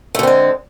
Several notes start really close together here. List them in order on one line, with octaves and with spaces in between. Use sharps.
A3 D3 C4 G#3